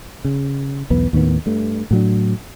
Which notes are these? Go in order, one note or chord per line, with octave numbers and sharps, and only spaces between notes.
C#3
B1 E2 B3
D#2 A2 D#3 B3
G2 A3
A2 F#3 D4